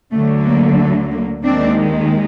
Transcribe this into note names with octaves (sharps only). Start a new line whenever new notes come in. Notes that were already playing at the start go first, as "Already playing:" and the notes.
D2 D3 F#3 A3
A#3
A3
A#3
D#2 D#3 G#3 C4 D4